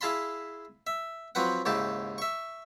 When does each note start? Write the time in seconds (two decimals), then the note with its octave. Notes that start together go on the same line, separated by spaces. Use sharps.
0.01 E4 G#4 F5 A5 B5 C6
0.87 E5
1.35 F3 F#3 C4 B4 F#5
1.66 D#2 G#2 C#3 E4 G4 A5
2.18 E5 C#6